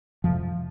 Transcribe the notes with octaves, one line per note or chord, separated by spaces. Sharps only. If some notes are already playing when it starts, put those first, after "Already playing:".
F2 C3 F3